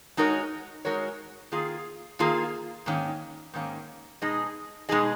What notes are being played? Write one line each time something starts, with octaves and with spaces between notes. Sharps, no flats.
G#3 D#4 F#4 A#4 C#5
G#3 D#4 F#4 A#4 C#5
D#3 A#3 F4 G#4
D#3 A#3 F4 G#4
G#2 D#3 A#3 C#4
G#2 D#3 A#3 C#4
B2 G#3 D#4 G#4 D#5
B2 G#3 D#4 G#4 D#5